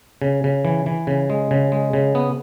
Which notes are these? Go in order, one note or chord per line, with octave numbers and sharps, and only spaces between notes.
C#3
C#3
E3
E3
C#3
G#3
C#3
G#3
C#3
B3